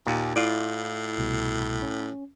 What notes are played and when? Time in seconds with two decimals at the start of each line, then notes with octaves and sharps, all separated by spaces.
0.07 D#2 A#2
0.36 A2 E4 F4 D5
1.18 C2 B2
1.82 C#4